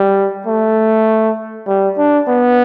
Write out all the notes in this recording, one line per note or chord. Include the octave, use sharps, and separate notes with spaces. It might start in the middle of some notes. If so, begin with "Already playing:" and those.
Already playing: G3
A3
G3
D4
B3